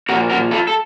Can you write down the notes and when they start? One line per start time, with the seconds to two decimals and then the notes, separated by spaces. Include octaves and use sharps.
0.09 A#2 F3 F#4 A#4
0.30 F#4 A#4
0.51 F4 A4
0.67 A4